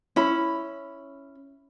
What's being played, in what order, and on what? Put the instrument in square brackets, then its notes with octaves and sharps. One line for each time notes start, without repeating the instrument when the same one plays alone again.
[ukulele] C#4 E4 B5